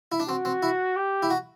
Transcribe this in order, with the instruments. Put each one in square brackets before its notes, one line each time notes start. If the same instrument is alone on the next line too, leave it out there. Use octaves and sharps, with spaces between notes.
[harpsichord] E4
D4
[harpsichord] C4 [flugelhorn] F#4
[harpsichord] C4
E4
[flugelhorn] G4
[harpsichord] E4
F#4